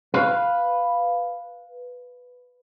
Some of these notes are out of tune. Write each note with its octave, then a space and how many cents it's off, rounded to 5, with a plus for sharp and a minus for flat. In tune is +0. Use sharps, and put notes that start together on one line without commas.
B4 +0 F5 +0